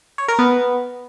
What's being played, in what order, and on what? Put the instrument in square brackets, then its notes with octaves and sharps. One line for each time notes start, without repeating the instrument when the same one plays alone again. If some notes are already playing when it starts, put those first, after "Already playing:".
[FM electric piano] C#5
A#4
B3